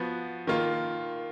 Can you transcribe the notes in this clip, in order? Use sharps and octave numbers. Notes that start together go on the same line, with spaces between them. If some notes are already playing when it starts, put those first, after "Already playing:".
Already playing: F3 B3 F#4
D#3 A#3 F4